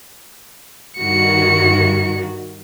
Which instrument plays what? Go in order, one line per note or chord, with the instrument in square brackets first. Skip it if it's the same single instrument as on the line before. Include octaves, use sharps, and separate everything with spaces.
[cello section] G2 D#3 F#4 [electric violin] C#7